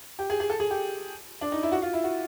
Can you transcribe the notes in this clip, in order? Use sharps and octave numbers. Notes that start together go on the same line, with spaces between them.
G4
G#4
G#4
A4
G#4
G4
D4
D#4
E4
F#4
F4
E4
F#4